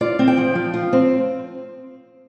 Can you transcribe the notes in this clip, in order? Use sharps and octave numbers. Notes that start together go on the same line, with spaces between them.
F4 D5
C4
G5
F3
F3
F4
C4